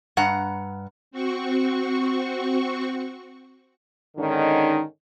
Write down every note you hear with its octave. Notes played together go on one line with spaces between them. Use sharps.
G2 F#5 A#5
C4 F#4 C#6
G#2 D3 D#3 C#4 D#4